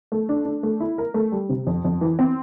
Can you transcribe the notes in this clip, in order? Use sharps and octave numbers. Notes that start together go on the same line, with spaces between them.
A3
D4
D4
A3
E4
A#4
A3
G3
C3
F2
F2
E3
C4